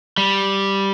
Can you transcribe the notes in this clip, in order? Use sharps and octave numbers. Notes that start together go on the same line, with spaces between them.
G3